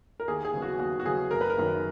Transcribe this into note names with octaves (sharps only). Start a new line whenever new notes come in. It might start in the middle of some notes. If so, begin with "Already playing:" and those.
A#4
D#2 G#4
G#4
C#3 F#3 B3
F#4
D#2 F#4
F#4
C#3 F#3 B3 G#4
F#1 A#4
B4
A#4
F#2 D#3 A#3